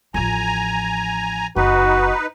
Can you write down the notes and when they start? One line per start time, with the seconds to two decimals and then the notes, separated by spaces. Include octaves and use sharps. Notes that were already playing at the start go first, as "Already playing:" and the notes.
0.14 A1 F3 G#5 A#5
1.56 F#1 D#4 F#4 B4